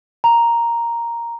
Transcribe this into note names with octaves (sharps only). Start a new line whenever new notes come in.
A#5